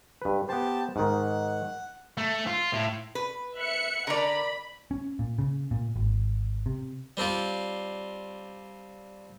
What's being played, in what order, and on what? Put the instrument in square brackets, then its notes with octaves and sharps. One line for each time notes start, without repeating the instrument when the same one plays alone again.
[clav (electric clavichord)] G2 B4
[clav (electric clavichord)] B3 C5 [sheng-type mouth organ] G4 A5
[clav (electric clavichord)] G#2 D#3 [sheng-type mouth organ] F#5
[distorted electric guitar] A3
F4
A2
[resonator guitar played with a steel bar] B4
[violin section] E5 F#6 C#7
[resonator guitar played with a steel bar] D3 A#5 [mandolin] A#4 B4 D5 [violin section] B5
[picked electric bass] C#4
A#2
C#3
A#2
G#1
C3
[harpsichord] G3 C4 D4 F4